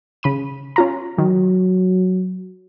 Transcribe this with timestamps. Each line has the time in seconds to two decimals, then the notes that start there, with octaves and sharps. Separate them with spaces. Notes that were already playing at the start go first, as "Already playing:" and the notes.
0.23 C#3 B5 D#7
0.76 C#4 F4 A#5
1.18 D#3 F#3